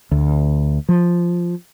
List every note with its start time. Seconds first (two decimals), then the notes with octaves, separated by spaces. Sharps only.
0.11 D2
0.89 F3